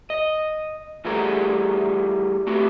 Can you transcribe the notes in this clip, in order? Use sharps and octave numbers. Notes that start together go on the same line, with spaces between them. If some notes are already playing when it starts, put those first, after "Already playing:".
D#5
E3 G3 A3 F#4 G#4 A#4
A3 B3 C4 F#4 G4